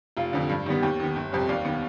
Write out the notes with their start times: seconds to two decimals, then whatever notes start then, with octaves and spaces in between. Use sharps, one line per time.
0.17 F1 F4
0.33 F2 D3
0.49 G2
0.66 D#3 G3 B3
0.82 D#2 G4
1.00 D#3 B3
1.16 G1
1.32 F2 C3 G3
1.49 D#2 D5 F5
1.65 D#3 B3